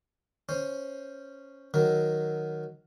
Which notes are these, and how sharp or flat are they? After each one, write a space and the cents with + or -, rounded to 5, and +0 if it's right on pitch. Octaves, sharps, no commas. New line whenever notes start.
C#4 +0 C5 +0
D#3 +0 F#3 +0 A#4 +0